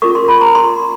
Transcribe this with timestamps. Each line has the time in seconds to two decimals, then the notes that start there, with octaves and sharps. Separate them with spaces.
0.02 C#4 F4 A#4 C#6
0.15 C6
0.28 B5
0.41 A#5
0.55 C6